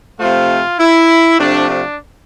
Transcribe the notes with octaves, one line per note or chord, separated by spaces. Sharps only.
C3 F3 A3 F4
E4
C3 F3 A3 D4
D4